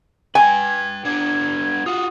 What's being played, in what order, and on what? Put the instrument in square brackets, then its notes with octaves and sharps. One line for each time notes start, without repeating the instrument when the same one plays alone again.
[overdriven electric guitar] B4 G5 [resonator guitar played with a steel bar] G#5 [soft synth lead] G#6
[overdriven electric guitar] B3 D4 [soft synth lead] G#6
[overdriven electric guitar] F4 F#4 [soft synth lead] D#6